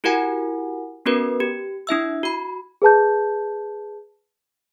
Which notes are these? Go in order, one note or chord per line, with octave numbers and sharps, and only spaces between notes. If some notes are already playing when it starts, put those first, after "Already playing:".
E4 F#4 G4 A#4 F#5 G#5
B3 C#4 F#4 A#4 B4
G4
D4 E4 E5 E6
F#4 B5
G#4 B4 A5 G6